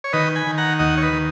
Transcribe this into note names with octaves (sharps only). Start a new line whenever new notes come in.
C#5
D#3 B4 D#5
G#5 B5
D#3
F#5 A#5
D#2 D#5 F#5
C#5
B4 D#5
D#3